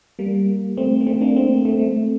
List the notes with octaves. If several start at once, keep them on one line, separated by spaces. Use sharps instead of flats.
G3 A#3
A3 C4
A#3
A3 C4
A#3 D4
A3 C4
A3
A3